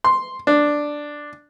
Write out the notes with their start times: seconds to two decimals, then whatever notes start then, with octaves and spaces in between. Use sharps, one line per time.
0.04 C6
0.47 D4